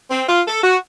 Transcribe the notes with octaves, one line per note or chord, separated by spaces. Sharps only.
C4
F4
A4
F#4